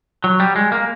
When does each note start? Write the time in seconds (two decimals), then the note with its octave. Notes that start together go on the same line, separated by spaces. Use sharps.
0.24 F#3
0.40 G3
0.56 G#3
0.72 A#3